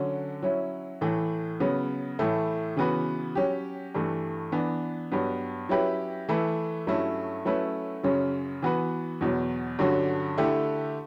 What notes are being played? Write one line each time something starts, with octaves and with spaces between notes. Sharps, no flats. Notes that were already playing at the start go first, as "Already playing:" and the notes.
Already playing: D3 F#3 C#4
F#3 C#4 E4
A2 E3 A3
C#3 F#3 B3
A2 E3 A3 E4
C#3 E3 B3 F#4 B4
F#3 C#4 G4
G2 E3 A3
E3 B3 D4
G2 F#3 B3
F#3 C#4 E4 G4 B4
E3 A3 E4 B4
G2 F#3 A3 C#4 E4
F#3 A3 C#4 E4 B4
F#2 C#3 F#3 C#4
E3 B3 F#4 B4
E2 B2 F#3
G2 D3 F#3 C#4 F#4
D3 A3 E4 G4